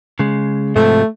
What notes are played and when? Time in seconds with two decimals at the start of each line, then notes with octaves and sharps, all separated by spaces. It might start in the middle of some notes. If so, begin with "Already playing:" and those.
0.19 C#3 G#3
0.76 G#2 C3 F3 A3